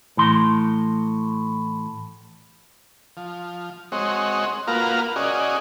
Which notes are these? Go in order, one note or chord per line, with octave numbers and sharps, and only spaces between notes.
A2 E3 C6
F3
G#3 C4 F#4 C#5 D#5
A#3 F4 F#4 A#4 B4 F5
C#4 F#4 G#4 D5 D#5